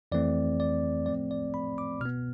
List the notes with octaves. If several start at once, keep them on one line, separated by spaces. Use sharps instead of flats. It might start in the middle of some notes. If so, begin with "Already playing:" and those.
F2 E3 A3 C4 D5
D5
A2 F3 A3 C4 D5
D5
B5
D6
B2 B3 F6